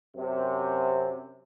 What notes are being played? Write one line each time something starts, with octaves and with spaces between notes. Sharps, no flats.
F#2 C3